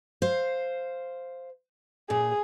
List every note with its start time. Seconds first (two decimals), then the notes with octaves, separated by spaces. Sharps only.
0.22 C5 F5
2.10 A#2 G#4